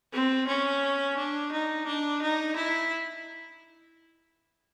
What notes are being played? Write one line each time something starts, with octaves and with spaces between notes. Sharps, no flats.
C4
C#4
D4
D#4
D4
D#4
E4